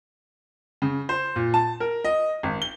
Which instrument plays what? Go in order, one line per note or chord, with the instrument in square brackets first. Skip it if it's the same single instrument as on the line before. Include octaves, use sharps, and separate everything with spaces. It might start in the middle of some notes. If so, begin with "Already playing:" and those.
[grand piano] C#3
C5
A#2
A5
A#4
D#5
G#1
G7